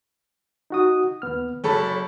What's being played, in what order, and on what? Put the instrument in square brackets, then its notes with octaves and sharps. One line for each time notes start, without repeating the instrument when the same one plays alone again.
[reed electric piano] D#4 F#4 D#6
D#2 B3 F6
[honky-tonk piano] F#1 A4 B5 [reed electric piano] C#5